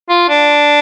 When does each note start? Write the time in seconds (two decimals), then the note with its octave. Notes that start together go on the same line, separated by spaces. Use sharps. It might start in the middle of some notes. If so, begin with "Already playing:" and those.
0.10 F4
0.29 D4